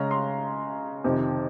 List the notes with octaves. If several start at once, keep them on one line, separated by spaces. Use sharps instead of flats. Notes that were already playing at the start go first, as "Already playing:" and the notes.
Already playing: C#3 G#3 C#4 A#5
C6
F2 C3 D#3